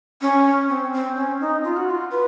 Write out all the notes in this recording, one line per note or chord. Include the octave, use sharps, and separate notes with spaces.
C#4
C4
C4
C#4
D#4
F4
F#4
F4
B4